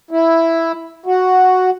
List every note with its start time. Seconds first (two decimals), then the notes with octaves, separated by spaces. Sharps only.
0.11 E4
1.06 F#4